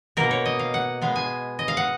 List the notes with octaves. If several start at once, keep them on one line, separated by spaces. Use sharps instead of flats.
B2 A#3 A#4
C#5
D#5
F5
F#5
B2 G#3 B3 F5
G#5
D#5
F5
F#5